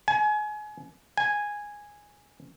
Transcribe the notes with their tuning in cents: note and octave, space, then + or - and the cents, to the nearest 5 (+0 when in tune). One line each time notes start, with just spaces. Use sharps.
G#5 +30
G#5 -5